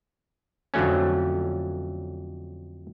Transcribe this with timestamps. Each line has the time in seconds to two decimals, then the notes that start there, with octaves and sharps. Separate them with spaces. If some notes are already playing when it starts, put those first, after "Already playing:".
0.74 F2 D3 F#3 A3 C#4